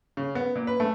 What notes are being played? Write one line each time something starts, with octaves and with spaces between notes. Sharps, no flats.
C#3
B3
A#2
B4
A3